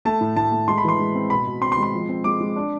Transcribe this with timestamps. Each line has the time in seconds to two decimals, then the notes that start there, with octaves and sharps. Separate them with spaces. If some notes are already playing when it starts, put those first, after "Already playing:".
0.05 A3 A5
0.21 A2
0.36 A2 A5
0.52 A3
0.68 G#3 C6
0.78 B5
0.84 E3 C6
0.99 G#3
1.15 C4
1.30 B2 B5
1.47 B2
1.61 C4 C6
1.72 C6
1.78 G#3
1.83 C6
1.93 F3
2.09 C4
2.24 G#3 D6
2.40 G#3
2.56 D4